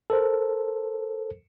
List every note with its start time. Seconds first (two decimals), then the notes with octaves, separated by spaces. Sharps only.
0.10 A4 A#4 C5